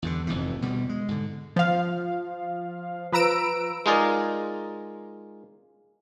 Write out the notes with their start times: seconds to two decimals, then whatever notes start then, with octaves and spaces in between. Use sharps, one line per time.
0.02 E2 G2 D3
0.27 F1 F2 G#2 E3
0.61 D2 B2 G3
0.89 G#3
1.08 G#2 D3
1.56 F3 F5
3.12 F3 B4 A#5 E6 D7
3.86 G#3 D#4 F4 G#4 A#4 D5